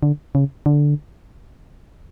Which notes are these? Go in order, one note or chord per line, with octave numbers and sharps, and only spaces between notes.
D3
C#3
D3